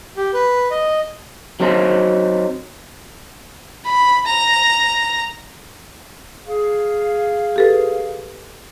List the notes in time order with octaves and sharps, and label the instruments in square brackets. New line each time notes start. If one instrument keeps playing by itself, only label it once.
[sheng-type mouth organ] G4
B4
D#5
[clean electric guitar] F#3 C4 D#4 C5
[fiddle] B5
A#5
[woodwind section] G#4 F5
[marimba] G4 A4 B4